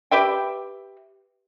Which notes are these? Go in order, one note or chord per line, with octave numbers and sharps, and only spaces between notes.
G4 B4 E5 G5